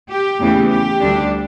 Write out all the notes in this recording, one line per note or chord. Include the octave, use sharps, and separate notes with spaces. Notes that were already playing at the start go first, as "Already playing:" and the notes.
G4
E2 C#3 E3 A3
G4
D2 D3 G3 D4